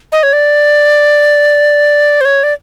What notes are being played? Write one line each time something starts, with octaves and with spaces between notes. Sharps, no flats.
D#5
C#5
D5
C5
C#5
D5